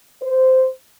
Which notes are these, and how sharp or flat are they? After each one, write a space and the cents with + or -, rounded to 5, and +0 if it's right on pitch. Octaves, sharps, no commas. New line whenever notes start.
C5 -10